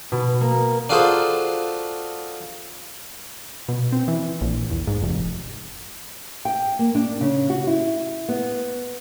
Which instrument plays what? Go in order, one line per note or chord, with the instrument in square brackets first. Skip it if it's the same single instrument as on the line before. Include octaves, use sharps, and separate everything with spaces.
[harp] B2
A#3
[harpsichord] D4 F4 F#4 G#4 A4 C5
[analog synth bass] B2
C4
E3
A#1
E2
G#2
F1
[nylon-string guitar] G5
A#3
D4
C#3
F#4
E4
B3